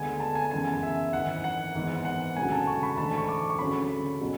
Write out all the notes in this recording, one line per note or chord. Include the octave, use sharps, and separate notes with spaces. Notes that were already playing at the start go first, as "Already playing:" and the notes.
Already playing: D2 D3 G#3 B3 G#5
A5
G#5
A5
F#2 C#3 E3 G#3 B3 G#5
E5
G#1 G#2 E3 F#5
F#5
G#1 G#2 E3 G#3 B3
F#5
E1 D2 C#3 F#3 G#5
A5
C#6
B5
G#2 E3 A3 D4 A5
C#6
D6
C#6
D2 C#3 F#3 C#4 B5
B2 F#3 C#4